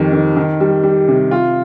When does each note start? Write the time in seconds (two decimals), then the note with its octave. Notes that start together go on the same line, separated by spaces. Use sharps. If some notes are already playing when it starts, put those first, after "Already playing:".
Already playing: F2 D#3 G3
0.13 D#3
0.37 D#3
0.60 G3
0.83 G3
1.08 C3
1.31 F4